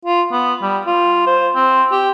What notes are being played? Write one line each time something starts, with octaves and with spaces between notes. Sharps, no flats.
F4
B3
G3
F4
C5
C4
G4